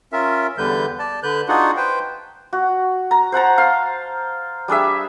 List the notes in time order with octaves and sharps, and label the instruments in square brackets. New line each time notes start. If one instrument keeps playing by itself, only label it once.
[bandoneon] C#4 F4 A#4 E5
E2 D3 G3 B4 G6
D5 A5
D3 B4 F#6 G6
D4 D#4 F4 F#4 G#4 F#5
B4 C5 G5
[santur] F#4
A#5
C5 F#5 A5 A#5
F5 C6
G3 D4 G#4 E5